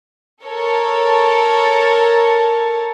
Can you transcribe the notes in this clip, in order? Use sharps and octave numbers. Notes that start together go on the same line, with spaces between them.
A4 A#4 C#5 A5